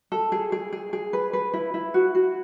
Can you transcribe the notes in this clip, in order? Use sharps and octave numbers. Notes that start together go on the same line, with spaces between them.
A4
G#4
G#4
G#4
G#4
B4
B4
E4
E4
F#4
F#4